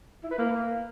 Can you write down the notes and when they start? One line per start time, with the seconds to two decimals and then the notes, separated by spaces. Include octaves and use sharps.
0.23 E4
0.31 B4
0.38 A#3